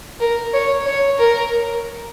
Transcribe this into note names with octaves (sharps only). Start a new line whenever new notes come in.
A#4
C#5
C#5
A#4